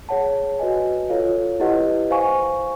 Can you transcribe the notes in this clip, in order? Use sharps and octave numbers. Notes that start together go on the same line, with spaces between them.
G#4 C#5 F#5 A5
F#4 B4 D#5 G#5
F4 A4 C#5 F5
E4 G4 B4 D#5 F#5
C5 F5 G#5 C#6